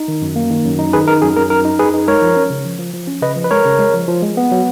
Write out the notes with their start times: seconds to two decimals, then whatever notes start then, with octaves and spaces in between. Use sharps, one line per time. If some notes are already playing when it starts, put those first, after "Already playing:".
Already playing: D#4
0.08 D#3
0.22 F#2
0.36 A#3
0.51 D#3
0.65 F#2
0.79 D#4
0.93 D#3 G#4 B4
1.08 D#4 A#4
1.22 F#2 G#4
1.36 F#2 A#4
1.50 D#4 A#4
1.65 D#4
1.79 F#2 G#4 B4
1.94 D#4
2.08 G#3 A#4 C#5
2.22 F3
2.36 C#4
2.50 C#3
2.65 F3
2.79 F3
2.94 F3
3.07 C#4
3.22 C#3 B4 D#5
3.36 F3
3.44 B4
3.51 G#3 A#4 C#5
3.65 C#3
3.79 G#3
3.94 F3
4.08 F3
4.22 G#3
4.37 B3
4.51 F#3